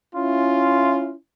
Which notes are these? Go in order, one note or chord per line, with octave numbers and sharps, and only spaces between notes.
C#4 E4 F4